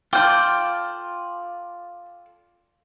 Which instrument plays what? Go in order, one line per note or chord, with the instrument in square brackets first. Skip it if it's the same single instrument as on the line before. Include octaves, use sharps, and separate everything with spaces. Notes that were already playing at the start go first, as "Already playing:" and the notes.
[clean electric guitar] F4 A4 D5 [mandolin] G5 G6 [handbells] D6 F6